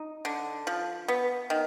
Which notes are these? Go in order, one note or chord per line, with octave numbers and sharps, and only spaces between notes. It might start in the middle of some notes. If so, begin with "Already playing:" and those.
Already playing: D#4
D3
F3
B3
D#3